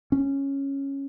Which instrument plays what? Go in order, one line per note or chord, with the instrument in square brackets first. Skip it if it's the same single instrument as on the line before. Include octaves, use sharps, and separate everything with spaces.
[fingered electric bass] C#4